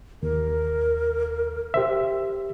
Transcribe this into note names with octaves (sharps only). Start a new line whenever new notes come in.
D#2 A#4
G4 C5 E5